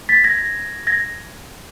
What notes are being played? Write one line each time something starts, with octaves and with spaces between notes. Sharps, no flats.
A6 B6
G#6 A#6
G#6 A#6